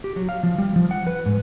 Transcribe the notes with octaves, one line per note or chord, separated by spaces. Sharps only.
G4
F#3
F5
F3
G3
F3
F#5
B4
G#2